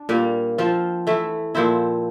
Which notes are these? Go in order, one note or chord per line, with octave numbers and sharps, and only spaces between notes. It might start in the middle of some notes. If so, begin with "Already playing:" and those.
Already playing: D4
A#2 G3 A#3
F3 C4 F4
E3 A3 E4
A#2 F3 C4 E4